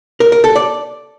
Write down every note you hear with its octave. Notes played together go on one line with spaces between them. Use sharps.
A#4
A#4
A4
D5